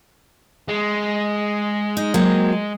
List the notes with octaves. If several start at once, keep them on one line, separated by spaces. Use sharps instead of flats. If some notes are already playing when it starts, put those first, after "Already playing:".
G#3
D#4
F#3 A#3 C4